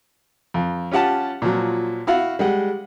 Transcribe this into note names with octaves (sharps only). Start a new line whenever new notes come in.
F2
C#4 F4 G4 F#5 A5
A#2 F3 F#3
E4 F#4 F5 F#5
G3 G#3 F#5